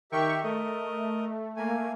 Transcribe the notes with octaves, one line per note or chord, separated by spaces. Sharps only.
D#3 G4 A#4 E5 G5 C#6
A3 A#4 D#5
A3 A#3 G#5